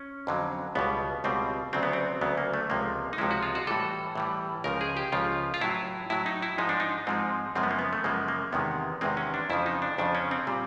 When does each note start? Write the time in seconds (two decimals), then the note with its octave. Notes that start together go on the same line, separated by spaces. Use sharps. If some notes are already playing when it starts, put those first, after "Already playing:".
Already playing: C#4
0.27 F2 D3 F#3
0.75 C#2 B2 G3 B3
1.24 C#2 B2 G3 C4
1.73 D2 C#3 F#3 C4
1.83 B3
1.93 C4
2.21 D2 C#3 F#3 B3
2.37 A#3
2.54 A3
2.70 C#2 C3 F3 G#3 A#3
3.13 D#4
3.18 C#2 C3 F3 G#3 E4
3.31 F#4
3.43 F4
3.55 F#4
3.67 A2 E3 G3 A4
4.15 A2 E3 G3
4.64 C#2 C#3 F3 A#4
4.81 G#4
4.97 G4
5.12 C#2 C#3 F3 F4
5.54 F4
5.61 A2 F#3 E4
6.10 A2 F#3 E4
6.26 D#4
6.42 E4
6.58 G#2 F3 G#3 D#4
6.69 D4
6.80 D#4
7.07 G#2 F3 G#3 C4
7.55 F#2 C#3 F3 G#3 C4
7.63 B3
7.71 A#3
7.79 B3
7.93 A3
8.04 F#2 C#3 F3 G#3 A#3
8.28 A#3
8.53 E2 C3 D#3 G#3 B3
9.01 E2 C3 D#3 G#3 C4
9.17 C#4
9.34 D4
9.50 F2 C#3 F3 E4
9.66 D#4
9.82 D4
9.98 F2 C#3 F3 D4
10.15 C#4
10.31 C4
10.47 A#2 G3